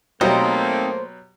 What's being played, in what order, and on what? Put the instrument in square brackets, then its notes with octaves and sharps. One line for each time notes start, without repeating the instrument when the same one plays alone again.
[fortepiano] B2 F#3 G4 [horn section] A3 A#3 [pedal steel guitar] C4 D#4 [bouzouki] C5